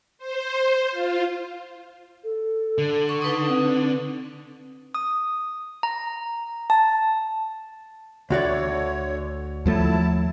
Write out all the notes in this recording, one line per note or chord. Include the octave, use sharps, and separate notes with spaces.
C5
F4
A4
D3
C#6
D#4 B4 D#6
C4
D#6
A#5
A5
D2 D3 F#4 C#5 D5
D#2 F3 F#3 A3 E4 A5